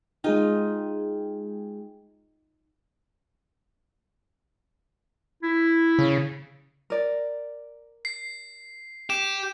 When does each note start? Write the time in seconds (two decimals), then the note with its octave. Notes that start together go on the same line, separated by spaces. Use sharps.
0.24 G#3 D#4 F4 G#4 G5
5.43 E4
5.99 C#3
6.90 A#4 D5
8.05 C7
9.10 G4 E7